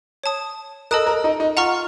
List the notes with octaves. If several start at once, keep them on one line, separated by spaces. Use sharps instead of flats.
C#5 A5 D#6
A4 A#4 D#5 A5 D#6 F#6
A#4
D#4
D#4
F4 F#5 A#5 C#6 F6